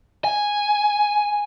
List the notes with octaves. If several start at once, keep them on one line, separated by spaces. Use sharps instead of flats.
G#5